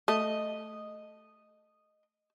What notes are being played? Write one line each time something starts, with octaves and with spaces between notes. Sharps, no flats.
A3 D#5